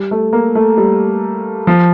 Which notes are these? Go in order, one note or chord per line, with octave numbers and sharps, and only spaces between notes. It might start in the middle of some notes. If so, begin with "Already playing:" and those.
Already playing: G3
A3
A#3
A3
G3
F3